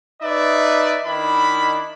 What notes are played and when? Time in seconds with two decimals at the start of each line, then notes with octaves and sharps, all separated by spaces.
0.22 D#4 B4 D5 E5
1.05 D#3 D4 E4 B5